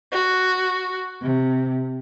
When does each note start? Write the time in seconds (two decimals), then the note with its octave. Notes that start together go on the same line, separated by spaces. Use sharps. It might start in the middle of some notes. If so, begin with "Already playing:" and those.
0.12 F#4
1.23 C3